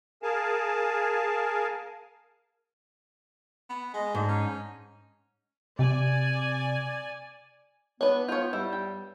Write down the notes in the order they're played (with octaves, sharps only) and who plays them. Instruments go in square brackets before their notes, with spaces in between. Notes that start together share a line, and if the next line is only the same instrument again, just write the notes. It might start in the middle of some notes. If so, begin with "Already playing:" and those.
[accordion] G#4 A#4 F5 G#5 A5
[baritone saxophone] B3
[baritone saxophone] G#3 [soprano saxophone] D#5
[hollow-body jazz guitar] G#2 [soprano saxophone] D4
[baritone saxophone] C#4 [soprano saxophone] D#4
[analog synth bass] C3 [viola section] D5 G#5
[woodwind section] B3 [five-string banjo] D4 B4 [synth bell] C#5
[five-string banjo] F4 C#5 [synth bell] G6
[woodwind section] G2 G3 [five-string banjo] E4
[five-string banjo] G5